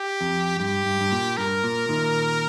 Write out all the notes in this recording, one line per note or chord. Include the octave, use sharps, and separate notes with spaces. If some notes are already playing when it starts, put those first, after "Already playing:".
Already playing: G4
F2
G2 G4
G2
G2
A#2
G2 A#4
A#2
A#2 D#3